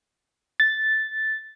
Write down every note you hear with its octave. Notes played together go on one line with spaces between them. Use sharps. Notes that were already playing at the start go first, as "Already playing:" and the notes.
A6